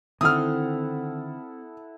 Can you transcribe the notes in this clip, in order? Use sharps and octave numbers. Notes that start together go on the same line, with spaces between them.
D3 D#3 C4 E4 A4 F#5 D#6 F6